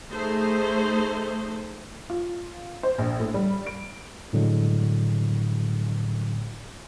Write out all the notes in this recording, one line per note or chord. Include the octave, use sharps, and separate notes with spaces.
A3 D#4 G#4 C5
F4
C5
A#1
A2
G3
D7
A2 D3 F#3 G#3